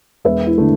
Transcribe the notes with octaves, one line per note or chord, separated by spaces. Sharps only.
E1 B4 E5
E4
D3 A3